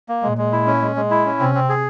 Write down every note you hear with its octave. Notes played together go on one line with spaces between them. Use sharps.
A#3
A#2 G#3
G#3
E4
C#4
G#3
G#3
E4
C#4
C3 C4
C4
G#4